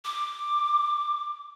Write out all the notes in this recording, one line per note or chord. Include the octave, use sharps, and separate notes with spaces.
D6